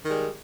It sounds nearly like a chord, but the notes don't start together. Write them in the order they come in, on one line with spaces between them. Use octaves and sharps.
D#3 G3 G#3